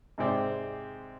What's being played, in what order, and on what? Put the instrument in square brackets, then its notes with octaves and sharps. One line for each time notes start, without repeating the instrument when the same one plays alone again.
[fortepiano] G#2 C3 G#3 C4 D5 D6